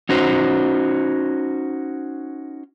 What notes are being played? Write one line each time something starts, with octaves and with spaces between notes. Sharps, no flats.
C#4 D#4 F#4 C5